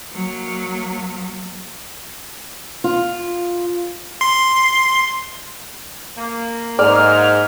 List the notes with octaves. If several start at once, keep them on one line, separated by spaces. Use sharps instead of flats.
F#3 A#3
F4
C6
A#3
G#2 D5 F6